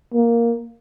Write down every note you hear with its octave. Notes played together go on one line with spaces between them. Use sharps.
A#3